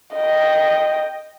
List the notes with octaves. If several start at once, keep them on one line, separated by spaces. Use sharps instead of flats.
D#5 G5